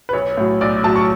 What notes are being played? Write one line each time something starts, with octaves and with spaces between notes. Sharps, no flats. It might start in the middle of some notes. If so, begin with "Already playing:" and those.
B4
B1 C#5
A2 F#3
B1 D5
A2 F#3 A5
C#6